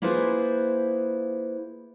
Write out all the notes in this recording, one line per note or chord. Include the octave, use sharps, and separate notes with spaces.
A#3 E4 F4 G#4 B4 C5